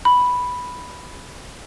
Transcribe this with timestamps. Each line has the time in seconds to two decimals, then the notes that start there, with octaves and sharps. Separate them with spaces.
0.05 B5